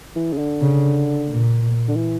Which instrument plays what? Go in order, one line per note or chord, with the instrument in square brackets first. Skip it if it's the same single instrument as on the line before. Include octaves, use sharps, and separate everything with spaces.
[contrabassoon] E3
C#3
D3
[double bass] C#3
A#2
[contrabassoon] D3
E3